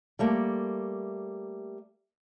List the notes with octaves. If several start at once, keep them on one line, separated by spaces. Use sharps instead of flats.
G3 A3 A#3